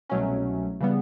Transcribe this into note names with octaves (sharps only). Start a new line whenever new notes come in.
C2 B2 F#3 A3 C#4
C#3 E3 G3 B3